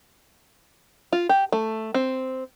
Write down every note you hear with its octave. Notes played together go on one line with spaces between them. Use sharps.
F4
G4
A3
C4